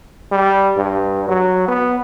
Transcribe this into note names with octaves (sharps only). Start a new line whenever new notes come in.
G3
G2
F#3
B3